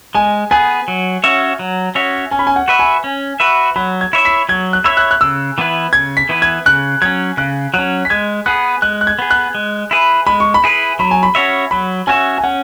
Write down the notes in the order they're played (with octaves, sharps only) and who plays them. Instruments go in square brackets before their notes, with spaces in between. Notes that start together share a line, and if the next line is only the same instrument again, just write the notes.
[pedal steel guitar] G#3 [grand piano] G#5
[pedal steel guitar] B3 G#4 [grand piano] G#5
[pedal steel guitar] F#3
C#4 F#4 C#5 E5
F#3
C#4 F#4 C#5 E5
[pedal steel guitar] C#4 [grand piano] G#5
[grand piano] B5
G#5
F#5
[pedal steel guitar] F#4 B4 E5
[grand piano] G#5
[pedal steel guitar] C#4
F#4 B4 E5
[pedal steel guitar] F#3 [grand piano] B5
[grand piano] G#6
[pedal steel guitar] E4 C#5 E5
[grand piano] B6
[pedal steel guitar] F#3 [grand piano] G#6
[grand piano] F#6
[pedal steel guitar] E4 C#5 E5 [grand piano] E6
[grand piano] F#6
F#6
[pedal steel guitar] C#3 [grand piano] E6
[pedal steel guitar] E3 B3 E4 B4
[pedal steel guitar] C#3 [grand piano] G#6
[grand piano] B6
[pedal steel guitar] E3 B3 E4 B4
[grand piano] G#6
[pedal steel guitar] C#3 [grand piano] F#6
[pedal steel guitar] F#3 C#4 [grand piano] G#6
[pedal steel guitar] C#3 [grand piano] F#6
[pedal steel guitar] F#3 C#4 [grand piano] F#6
[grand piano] B6
[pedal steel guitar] G#3 [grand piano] G#6
[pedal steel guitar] B3 G#4 [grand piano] F#6
[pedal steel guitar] G#3 [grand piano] F#6
[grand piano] F#6
G#6
[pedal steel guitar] B3 G#4
[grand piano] F#6
[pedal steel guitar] G#3
E4 G#4 B4
[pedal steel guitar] G#3 [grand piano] B5
[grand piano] C#6
B5
[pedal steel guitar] E4 G#4 B4
[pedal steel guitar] F#3 [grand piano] B5
[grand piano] G#5
B5
[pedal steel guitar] C#4 F#4 C#5 E5
[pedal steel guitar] F#3 [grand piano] B5
[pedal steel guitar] C#4 F#4 C#5 E5 [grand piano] G#5
[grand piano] G#5
[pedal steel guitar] C#4 [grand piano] F#5